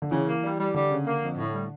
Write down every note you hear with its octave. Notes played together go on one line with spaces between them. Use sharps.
D3
C#3 E3
A#3
G3
G3
D3 G3
C#3
A#3
F2
A2
G3